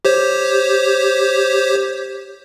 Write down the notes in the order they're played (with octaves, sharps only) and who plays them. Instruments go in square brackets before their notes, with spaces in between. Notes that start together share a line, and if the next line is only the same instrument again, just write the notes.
[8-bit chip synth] G4 C5 C#5